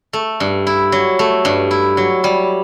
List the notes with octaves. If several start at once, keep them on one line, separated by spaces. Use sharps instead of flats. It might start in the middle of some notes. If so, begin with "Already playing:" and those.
A3
G2
E4
F#3
A3
G2
E4
F#3
G3